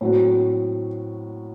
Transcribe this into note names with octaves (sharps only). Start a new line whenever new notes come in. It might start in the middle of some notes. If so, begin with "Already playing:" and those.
A2 F#3 C4 F#4